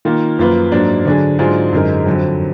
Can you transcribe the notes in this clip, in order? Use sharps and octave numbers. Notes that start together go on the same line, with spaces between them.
D#3 A#3 F4 A#4
F#2 F3 A#3 F4 B4
G#2 F#3 A#3 D4
D3 F#3 D4 G#4
G#2 F#3 D4 F4 G#4
F#2 D3 G#3 D#4 A#4
F2 D3 F#3